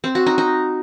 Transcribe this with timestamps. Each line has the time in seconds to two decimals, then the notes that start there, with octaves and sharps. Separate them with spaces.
0.04 C4
0.15 F#4
0.26 D#4
0.38 D#4